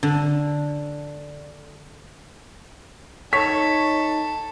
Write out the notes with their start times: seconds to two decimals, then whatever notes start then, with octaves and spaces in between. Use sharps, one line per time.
0.03 D3
3.33 D#4 A4 C#5 B6